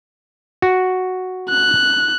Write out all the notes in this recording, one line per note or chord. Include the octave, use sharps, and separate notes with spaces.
F#4
F#6